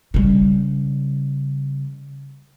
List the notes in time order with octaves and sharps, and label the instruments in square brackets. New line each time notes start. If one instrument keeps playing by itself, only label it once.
[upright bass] C#3 G3